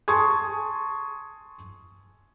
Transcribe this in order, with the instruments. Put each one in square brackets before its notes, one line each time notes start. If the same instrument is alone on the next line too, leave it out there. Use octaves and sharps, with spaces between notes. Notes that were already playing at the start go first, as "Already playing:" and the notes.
[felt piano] G#5 A5 C6 C#6 D#6 G#6